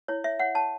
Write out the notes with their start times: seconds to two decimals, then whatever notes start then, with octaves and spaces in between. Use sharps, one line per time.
0.08 E4 C#5
0.24 C#5 E5
0.39 C#5 F#5
0.55 C#5 A5